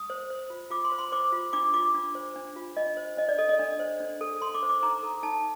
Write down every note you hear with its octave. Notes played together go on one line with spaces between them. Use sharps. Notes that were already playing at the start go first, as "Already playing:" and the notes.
Already playing: D#6
C5
C5
F4
F4 D6
C6
C5
C6
C5 D6
F4
D4 D6
F4 D6
D4
C5
D4
F4
D4 D#5
C5
D4 D#5
D5
A4 D#5
D#5
D4
C5
D4
A4
D4 C6
D6
C5
D6
D#4 A#5
A4
D#4 A5